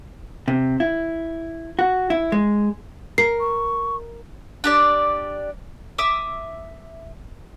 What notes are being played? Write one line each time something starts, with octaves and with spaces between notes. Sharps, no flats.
C3
E4
F#4
E4
G#3
A#4 C7
C#6
D4 G4 D5
E5 D6 D#6